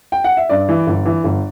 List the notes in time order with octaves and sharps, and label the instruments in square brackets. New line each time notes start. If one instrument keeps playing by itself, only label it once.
[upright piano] G5
F#5
E5
G2 D5
E3
G1
E3
G1